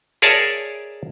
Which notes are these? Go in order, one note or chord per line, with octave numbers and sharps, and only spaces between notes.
G#4 A#4 C#5 D5 E5 A5